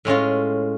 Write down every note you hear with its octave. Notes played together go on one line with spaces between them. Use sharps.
A2 G#3 C#4 F4